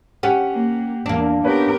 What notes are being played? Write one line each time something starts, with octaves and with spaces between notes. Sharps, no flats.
C#4 G4 F#5
A#3
E2 A#3 D4
B3 C#4 G4 A#4 B4